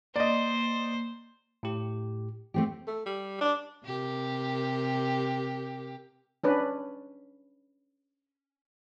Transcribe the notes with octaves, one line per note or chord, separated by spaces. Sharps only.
A#3 C5 D5 D#5
A2 G4
A3 C4 G4
A3
G3
D4
C3 G4 A#4
C#4 D4 B4